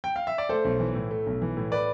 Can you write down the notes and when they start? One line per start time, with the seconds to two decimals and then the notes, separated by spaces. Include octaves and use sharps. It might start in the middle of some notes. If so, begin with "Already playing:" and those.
0.04 G5
0.16 F5
0.27 E5
0.38 D5
0.49 A3 A4 C5
0.65 B1
0.80 E3
0.95 A2
1.11 A3
1.27 B1
1.42 E3
1.57 A2
1.72 B4 D5